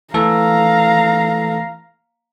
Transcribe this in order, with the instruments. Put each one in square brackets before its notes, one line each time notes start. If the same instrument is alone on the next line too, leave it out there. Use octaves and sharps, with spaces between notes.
[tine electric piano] E3 A3 A4 [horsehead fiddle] F5 A#5